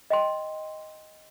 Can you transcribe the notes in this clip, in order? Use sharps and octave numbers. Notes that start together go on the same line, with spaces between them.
D#5 G5 C6